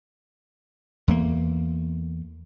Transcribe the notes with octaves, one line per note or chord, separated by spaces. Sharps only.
E2 A3 A#3